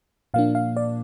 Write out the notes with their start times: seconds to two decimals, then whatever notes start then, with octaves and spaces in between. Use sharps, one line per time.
0.34 A#2 F3 A#3 D4 F5
0.55 F5
0.76 D5